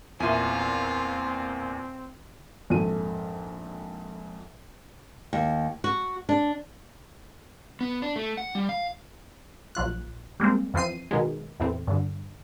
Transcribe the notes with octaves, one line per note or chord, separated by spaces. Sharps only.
E2 A#2 C4 F4 E5 G#5
A#1 F2 G#2 A4 D#7
D#2
F#4
D4
B3
D4
A3
F#5
G3
F5
A#1 F#3 F4 F#6
G3 G#3 A#3 C4
F2 E3 F3 C4 C7 D#7
B2 D#3 F#3 G#3
E2 A2 E3 C4
G2 D3